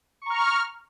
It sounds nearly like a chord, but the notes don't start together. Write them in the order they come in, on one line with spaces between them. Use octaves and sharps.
C#6 A#5 F6